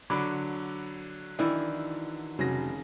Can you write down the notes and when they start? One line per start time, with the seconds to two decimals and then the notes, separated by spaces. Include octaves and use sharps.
0.10 D3 F#3 B5 D6
1.39 D#3 E3 D4 E4
2.39 F1 C#3 F#3 A#6